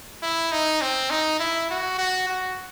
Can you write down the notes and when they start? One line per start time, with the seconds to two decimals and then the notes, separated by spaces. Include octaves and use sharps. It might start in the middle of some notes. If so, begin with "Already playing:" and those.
0.23 E4
0.52 D#4
0.82 C4
1.10 D#4
1.40 E4
1.70 F#4
1.98 F#4
2.28 F#4